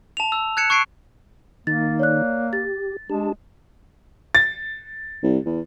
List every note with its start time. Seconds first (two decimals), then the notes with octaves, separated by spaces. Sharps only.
0.17 A5 F7
0.32 E6
0.57 F#6 G#6 C#7 E7
0.70 C#6 F#6 G#6 C7 D7
1.67 D#3 A#3 D#4 A6
1.99 C#5 D5 F#6
2.53 G4 A6
3.10 G#3 D4 G4 A5
4.35 A6
5.23 C2
5.46 E2